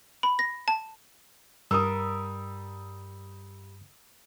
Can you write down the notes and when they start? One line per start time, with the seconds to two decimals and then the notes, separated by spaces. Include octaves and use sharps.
0.23 B5
0.39 A#6
0.68 A5
1.71 G2 G3 A#4 D#6 E6